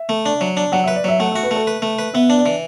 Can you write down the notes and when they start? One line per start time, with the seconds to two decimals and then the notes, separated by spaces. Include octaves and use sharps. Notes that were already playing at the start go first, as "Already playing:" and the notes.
Already playing: E5
0.09 A3
0.26 D4
0.41 F#3
0.57 D4
0.72 F#3 F#5
0.84 E5
0.88 B4
0.96 D5
1.04 F#3 E5
1.19 A3 F#5
1.32 E5
1.36 F#4
1.43 B4
1.51 A3 A4
1.67 B4
1.82 A3
1.99 B4
2.14 B3 E5
2.30 D4
2.38 D5
2.46 E3